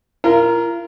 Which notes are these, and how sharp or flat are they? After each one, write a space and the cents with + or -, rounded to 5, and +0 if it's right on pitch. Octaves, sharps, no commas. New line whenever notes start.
F4 -40 A#4 +0